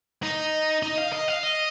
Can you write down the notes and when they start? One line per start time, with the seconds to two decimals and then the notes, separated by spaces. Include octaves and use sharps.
0.23 D#4
0.83 D#4
0.98 F5
1.13 D#5
1.28 F5
1.43 D#5